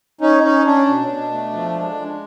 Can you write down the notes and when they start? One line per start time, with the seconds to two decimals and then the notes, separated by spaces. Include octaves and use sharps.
0.21 C#4 D#4
0.43 C#4 D#4
0.66 C#4 D4
0.87 B2
1.09 B2
1.31 A3
1.53 F3
1.75 G#3
1.97 G#3